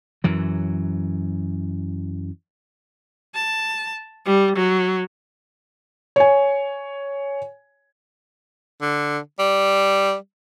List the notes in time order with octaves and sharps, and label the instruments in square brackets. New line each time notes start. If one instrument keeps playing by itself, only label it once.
[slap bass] F#2 E3 F#3
[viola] A5
G3
F#3
[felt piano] C#5 G#5
[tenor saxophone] D3
G3